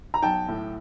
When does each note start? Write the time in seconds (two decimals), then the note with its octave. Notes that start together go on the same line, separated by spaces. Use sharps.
0.14 A#5
0.22 B1 G5 A5
0.48 A2